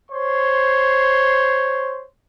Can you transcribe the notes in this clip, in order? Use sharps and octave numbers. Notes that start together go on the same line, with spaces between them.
C5 C#5 C6